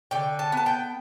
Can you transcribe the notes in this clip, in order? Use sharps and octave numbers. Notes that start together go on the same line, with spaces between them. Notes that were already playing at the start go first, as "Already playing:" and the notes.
D3 G5
A5
B3 A5
G5